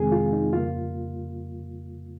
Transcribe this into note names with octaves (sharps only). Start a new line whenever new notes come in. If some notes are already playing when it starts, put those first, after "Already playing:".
Already playing: F2 C3 D#3 G#3 C4 G#4
F4
D#4
F2 C#3 G3 A#3 F4